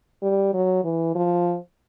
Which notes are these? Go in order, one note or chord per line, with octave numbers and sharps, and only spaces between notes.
G3
F#3
E3
F3